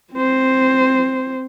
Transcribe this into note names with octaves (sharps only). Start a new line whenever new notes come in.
C4 C5